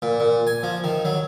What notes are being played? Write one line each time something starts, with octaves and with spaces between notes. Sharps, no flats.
A#2
A#2
G#5
F3
D#3
F#3